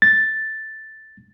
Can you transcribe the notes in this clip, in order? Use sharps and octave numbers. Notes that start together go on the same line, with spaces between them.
A6